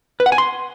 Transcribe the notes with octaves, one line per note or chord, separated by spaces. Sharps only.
B4
F#5
G#5
C6